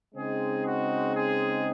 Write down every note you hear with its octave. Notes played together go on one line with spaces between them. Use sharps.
C#3 G#3 C4 D#4 G#4
F#4
G#4